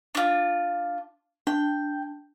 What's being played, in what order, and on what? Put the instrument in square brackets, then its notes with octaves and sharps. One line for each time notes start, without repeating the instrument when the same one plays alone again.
[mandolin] D4 F4
[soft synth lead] D4 [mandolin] G5